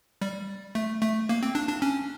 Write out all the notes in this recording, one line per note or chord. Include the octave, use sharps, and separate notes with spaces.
G3
A3
A3
A#3
C4
D4
D4
C#4